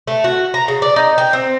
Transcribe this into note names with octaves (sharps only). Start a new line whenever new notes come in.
A3
F#4
A#5
C#3
D5
D#4
G5
C4